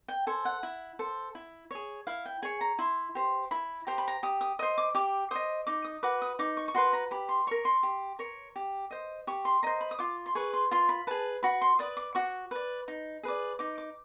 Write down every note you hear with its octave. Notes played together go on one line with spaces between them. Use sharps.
G5
A4 C5 G#5
F#5
E4
A4 C5
E4
G#4 C#5
E4 F5
G5
G#4 C#5 G#5
A#5
E4 C6
G4 C5
E4 B5
G4 C5 A#5
B5
A#5
G4 D#6
D#6
C5 D#5 D#6
D6
G4 D6
C5 D#5 D#6
D#4 D6
D#6
F#4 B4 D6
D#6
D#4 D6
C#6
C#6
F#4 B4 C6
A#5
G4 B5
C6
A#4 C#5 C#6
C6
G4
A#4 C#5
G4
C5 D#5
G4 C#6
C6
C5 D#5 A#5
B5
D#6
F4 D6
C6
G#4 B4 C#6
C6
F4 C6
B5
G#4 B4 A5
F#4 B5
C6
B4 D5 D#6
D6
F#4 C#6
B4 D5
D#4
G#4 B4 D5
D#4 D6
D6